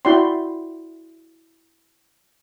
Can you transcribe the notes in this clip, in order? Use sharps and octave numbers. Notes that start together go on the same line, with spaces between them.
E4 F#4 D5 G5 C6